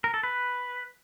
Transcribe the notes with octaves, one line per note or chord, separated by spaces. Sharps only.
A#4
A4
B4